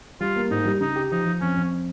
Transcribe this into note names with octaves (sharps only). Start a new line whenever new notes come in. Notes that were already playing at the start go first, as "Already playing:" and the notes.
G3 F4
A#3
G#2 D#4
G3
C#3 D#4
G4
F3 D#4
F3
F2 C#4
F2